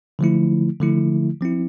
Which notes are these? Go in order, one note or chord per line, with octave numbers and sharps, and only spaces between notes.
D3 F3 A3 E4
D3 F3 A3 E4
F3 C4 E4